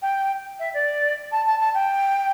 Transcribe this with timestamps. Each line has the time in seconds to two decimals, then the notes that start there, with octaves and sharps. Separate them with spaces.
0.02 G5
0.60 E5
0.74 D5
1.32 A5
1.46 A5
1.60 A5
1.74 G5